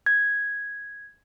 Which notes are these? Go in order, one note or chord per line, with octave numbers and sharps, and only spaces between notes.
G#6